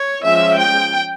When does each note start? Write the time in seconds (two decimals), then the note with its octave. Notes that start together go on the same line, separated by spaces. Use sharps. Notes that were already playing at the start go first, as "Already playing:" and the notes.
Already playing: C#5
0.24 F3 G#3 C#4 E5
0.59 G5